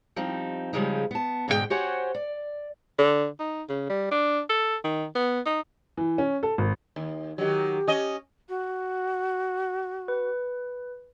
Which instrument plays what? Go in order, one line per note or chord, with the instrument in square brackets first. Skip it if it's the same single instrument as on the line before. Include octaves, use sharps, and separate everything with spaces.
[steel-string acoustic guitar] F3 G3 C4 D#4
C#3 F3 G3 G#3 C4 D#4
B3 A5
G#2 B2 D3 G#3 G4 G5
F#4 G4 C5 C#5 F#5 G#5
D5
[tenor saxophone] D3
D#4
C#3
G3
D4
A4
D#3
B3
D#4
[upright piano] E3
C#4
A4
G#1
[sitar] D#2
[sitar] D#3 F#3 [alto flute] G4
[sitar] C#4 D#5
[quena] F#4
[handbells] B4